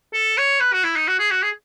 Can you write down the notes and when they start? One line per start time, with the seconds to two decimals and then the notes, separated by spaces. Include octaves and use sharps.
0.14 A4
0.38 C#5
0.60 B4
0.73 F#4
0.83 E4
0.96 D#4
1.08 F#4
1.19 G#4
1.31 F#4
1.43 G#4